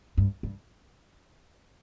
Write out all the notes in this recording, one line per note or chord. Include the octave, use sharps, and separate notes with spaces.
G2
G2